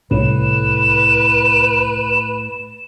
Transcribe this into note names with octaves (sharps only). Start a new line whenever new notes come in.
C2 A2 B4 E7